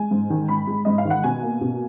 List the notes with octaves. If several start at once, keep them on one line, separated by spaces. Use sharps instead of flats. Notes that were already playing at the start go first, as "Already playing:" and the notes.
Already playing: G#3 G#5
G#2
D#3
G#2 B5
G#3
G#2 D#5
F5
D#3
F#5
B2 G#5
A#3
B2